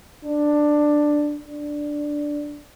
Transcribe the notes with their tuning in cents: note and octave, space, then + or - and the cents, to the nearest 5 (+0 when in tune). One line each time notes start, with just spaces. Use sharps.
D4 +10
D4 +0